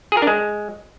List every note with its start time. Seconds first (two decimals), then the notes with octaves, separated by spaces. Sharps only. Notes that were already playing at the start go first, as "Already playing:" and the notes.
0.12 G#4
0.17 A#4
0.22 D4
0.27 G#3